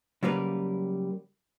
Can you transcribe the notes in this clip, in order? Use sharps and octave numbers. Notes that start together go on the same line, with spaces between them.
C#3 F#3 G3 A#3 A#4 B4